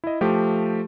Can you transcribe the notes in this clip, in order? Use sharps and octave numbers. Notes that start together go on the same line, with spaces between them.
E4 D#5
F3 A3 G4